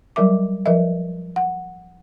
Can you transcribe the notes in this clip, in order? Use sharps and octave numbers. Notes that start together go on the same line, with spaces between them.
F#3 G3 A#4 E5 D6
F3 A#4 B4 D#5 E5
F#5